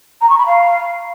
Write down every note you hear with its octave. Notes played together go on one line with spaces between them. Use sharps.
A#5
C#6
B5
F5